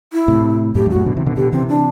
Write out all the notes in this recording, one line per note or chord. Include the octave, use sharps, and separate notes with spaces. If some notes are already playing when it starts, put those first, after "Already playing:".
E4
A2 C3
F#2 A2 G4
E2 G2
F#4
F#2 A2
B2 D3
C3 E3
B2 D3
B2 D3 G4
C3 E3 C4
D4